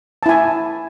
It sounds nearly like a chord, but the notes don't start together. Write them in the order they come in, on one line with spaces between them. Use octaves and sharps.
A5 E4 G#5